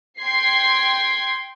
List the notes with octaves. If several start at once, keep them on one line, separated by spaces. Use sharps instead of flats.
G5 C6 G#6 C7